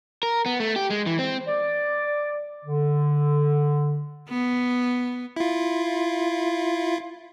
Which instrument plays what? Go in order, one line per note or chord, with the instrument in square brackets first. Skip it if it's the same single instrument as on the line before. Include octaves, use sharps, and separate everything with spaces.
[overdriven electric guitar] A#4
B3
A3
G4
G#3
E3
C4
[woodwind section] D5
D3
[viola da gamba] B3
[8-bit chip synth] E4 F4